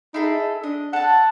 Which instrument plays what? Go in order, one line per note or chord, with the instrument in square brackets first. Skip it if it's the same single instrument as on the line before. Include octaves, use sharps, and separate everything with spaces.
[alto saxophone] D#4 [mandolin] E4 G#4 A4
[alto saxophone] D#5
[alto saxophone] D4 [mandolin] D#5
[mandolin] A4 A5 [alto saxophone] F#5